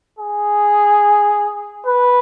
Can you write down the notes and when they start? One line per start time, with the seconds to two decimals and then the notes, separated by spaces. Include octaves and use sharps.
0.19 G#4
1.86 B4